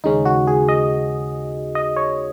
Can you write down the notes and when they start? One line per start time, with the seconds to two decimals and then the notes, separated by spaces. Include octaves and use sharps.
0.04 D#2 C#3 G#3 C#4 D#4
0.25 F#4
0.47 G#4
0.69 D#5
1.75 D#5
1.96 C#5